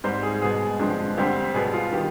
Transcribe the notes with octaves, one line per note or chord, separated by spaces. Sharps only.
G#2 G3 C4 C5
G#4
B2 G#3 B3 G#4
G2 D3 F3 G#3 C4
D2 D3 G3 C4 G4
B2 G3 B3 G#4
F4
D#3 B3 G4